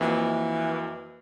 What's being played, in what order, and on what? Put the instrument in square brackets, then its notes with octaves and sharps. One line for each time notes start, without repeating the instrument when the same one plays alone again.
[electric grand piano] F2 A#3 F#4 [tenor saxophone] E3